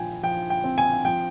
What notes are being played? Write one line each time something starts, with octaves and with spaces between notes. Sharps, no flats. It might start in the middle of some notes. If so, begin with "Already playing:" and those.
Already playing: A#2 F3 G5 G#5
F3 G5
G5
C4
G#5
F3 G5